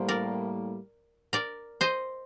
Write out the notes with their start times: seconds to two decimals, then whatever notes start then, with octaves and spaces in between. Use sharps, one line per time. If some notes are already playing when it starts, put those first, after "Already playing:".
Already playing: A2 G3 A#3 C5
0.09 A#4 D5
1.33 A#4 D5
1.81 C5 D#5